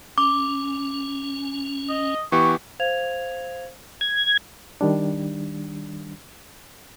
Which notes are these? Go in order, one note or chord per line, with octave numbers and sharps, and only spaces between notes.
C#4 D6
D#5
E3 B3 G4 C#6
C5 F5 G#6 F7
G#6
D#3 G3 D4